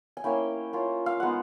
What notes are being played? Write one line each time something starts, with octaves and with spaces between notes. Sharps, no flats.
G#5
A#3 C#4 E4 G5
A#3 C#4 F4
F5
G#3 B3 D#4 F#5